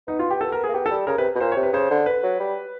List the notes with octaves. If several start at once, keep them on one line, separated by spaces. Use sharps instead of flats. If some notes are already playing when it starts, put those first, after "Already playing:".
B3 D#4
F4
G4
A4
A#4
G#4
A#3
B3 G4
A4
G3
C#3 A#4
C3 B4
B2
A#2 C5
C#5
C3
B4
C#3 C5
D3
B4
F#3
G3